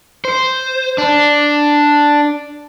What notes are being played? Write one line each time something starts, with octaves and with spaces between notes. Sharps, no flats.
C5
D4